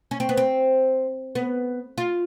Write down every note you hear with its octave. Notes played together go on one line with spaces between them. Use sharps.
C#4
C4
B3
C4
B3
F4